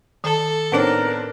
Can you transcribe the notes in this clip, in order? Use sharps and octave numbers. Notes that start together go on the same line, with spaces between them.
D#3 A4 A5
A2 B3 C4 D4 D#4 A#4 C#5